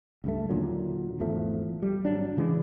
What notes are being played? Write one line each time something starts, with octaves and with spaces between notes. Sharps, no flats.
C#2 G2 A3
D#2 A#2 D3 F#3
G#1 E2 F3 A3
G3
G#1 F#3 D4
C#3 E3 G#3